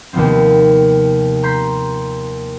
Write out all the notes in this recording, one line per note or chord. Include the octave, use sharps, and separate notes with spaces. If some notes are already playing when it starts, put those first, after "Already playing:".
D#2 C3 F3 B3 C4
A#5 C6 G6 B6 C7